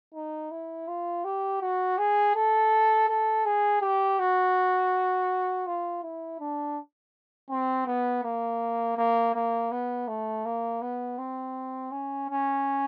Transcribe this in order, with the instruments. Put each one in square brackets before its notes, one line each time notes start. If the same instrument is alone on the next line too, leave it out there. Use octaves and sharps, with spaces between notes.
[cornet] D#4
E4
F4
G4
F#4
G#4
A4
A4
G#4
G4
F#4
F4
E4
D4
C4
B3
A#3
A#3
A#3
B3
A3
A#3
B3
C4
C#4
C#4